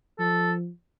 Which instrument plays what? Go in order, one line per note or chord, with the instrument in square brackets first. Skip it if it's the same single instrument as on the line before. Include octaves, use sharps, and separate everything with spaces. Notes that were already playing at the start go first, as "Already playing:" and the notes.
[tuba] F3 [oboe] A4